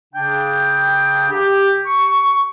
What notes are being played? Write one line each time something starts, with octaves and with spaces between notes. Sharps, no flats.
C#3 D4 G5
G4
C#6